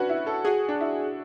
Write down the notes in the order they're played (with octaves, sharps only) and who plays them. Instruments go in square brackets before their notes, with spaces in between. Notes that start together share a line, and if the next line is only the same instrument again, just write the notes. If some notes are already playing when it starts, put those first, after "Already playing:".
Already playing: [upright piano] C#4 D4 F#4 [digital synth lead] B4
[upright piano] E4
A4
[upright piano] F#4 [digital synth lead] G#4
[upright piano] D4
E4